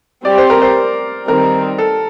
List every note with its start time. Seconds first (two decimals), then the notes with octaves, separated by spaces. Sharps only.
0.25 G3 C4 G4 D5
0.38 C5
0.50 A#4
0.62 C5
1.28 D#3 G3 C4 A#4
1.78 A4